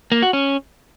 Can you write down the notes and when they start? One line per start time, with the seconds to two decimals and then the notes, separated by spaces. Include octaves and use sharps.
0.12 A#3
0.22 F#4
0.33 C#4